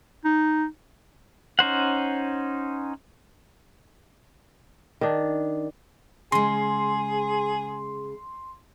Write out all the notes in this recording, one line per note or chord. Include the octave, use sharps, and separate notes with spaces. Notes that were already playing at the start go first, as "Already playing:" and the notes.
D#4
C#4 D#4 C5 F#5
D#3 D4
C#3 G#3 G#4 C6